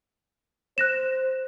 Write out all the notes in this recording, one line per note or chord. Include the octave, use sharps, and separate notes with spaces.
C5 F#6 A#6 E7